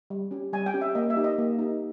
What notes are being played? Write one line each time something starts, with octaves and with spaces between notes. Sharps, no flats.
G3
C#4 G4
G3 G#5
G5
C#4 G4
E5
A#3 D#5
E5
D#4 G4
D#5
A#3
D#4 G4